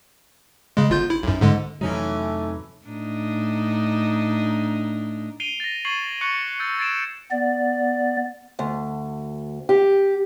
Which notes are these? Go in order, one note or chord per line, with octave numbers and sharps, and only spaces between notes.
C#3 G#3
G1 F4 G6
E4
B1 F#2
G#2 D3 G#3
F2 C3 E3 F#3 A3 C#4 D#4
A2 D4 D#4
C7 D7 D#7 F7 G7
A6 A#6
C#6 G#6 C7 D#7 F#7
C#6 F#6 C#7
E6 G6 A6 C#7
G#6 A6 C7 D7 E7
B3 D5
D2
G4